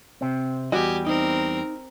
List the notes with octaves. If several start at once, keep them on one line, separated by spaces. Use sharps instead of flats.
C3 C4
E2 G3 F#4 G4 D#5 G#5
C4 D#4 A#4